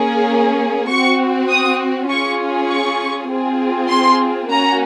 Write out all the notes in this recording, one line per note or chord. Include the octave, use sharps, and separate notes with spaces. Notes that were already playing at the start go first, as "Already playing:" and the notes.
Already playing: A#3 C#4 G#4
C4 F#4 C#6
D#6
C#4 F4 G#4 C#6
C#6
C4 F4 G#4
C6
A#3 C#4 F#4 A#5